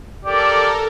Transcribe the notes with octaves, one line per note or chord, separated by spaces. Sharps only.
G4 A4 A#4 D5